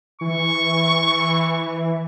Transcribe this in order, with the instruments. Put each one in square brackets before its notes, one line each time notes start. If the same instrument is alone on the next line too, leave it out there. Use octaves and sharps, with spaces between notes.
[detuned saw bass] E3 [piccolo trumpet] C#6